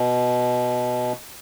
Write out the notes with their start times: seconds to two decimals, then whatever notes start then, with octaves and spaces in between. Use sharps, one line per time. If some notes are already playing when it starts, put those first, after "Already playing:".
Already playing: B2